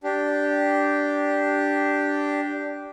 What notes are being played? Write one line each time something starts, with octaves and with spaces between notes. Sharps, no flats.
D4 G4